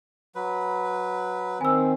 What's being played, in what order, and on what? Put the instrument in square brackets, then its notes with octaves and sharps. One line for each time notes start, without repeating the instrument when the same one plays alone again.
[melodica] F#3 B4
[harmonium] D#3 C4 [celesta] G#5 E6